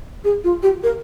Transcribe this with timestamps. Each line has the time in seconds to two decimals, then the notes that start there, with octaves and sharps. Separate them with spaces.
0.24 G#4
0.44 F4
0.63 G4
0.83 A#4